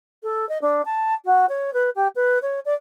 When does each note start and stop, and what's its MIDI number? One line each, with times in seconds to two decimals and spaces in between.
0.23 0.48 69
0.49 0.58 75
0.61 0.82 62
0.85 1.14 81
1.25 1.46 66
1.49 1.73 73
1.73 1.90 71
1.95 2.08 67
2.15 2.38 71
2.42 2.60 73
2.65 2.74 74